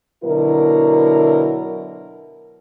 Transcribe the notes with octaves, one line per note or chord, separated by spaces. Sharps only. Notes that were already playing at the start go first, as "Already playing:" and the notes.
B2 D3 F#3 E4 A#4